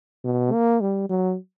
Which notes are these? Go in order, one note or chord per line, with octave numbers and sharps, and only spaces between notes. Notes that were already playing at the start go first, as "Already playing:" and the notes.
B2
A#3
G3
F#3